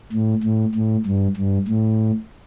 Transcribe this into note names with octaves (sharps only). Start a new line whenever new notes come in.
A2
A2
A2
G2
G2
A2